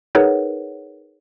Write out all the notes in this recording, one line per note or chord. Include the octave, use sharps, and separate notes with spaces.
D#4 G#4 A#4 B4 C#5 F#5